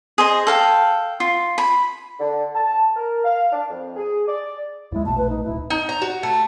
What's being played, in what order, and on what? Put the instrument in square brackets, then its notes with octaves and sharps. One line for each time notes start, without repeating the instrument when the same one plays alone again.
[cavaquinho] G#4 C5 D#5
A4 F5 G5
F4
B5
[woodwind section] D3
A5
A#4
F5
D4
F2
G#4
D5
[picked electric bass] D#2 G#3 [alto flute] E4
[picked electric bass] A#1 B2 A3 [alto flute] A5
[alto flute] B4
D#4
[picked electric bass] D1 [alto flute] E4
[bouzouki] D#4
A#5
F#4
A3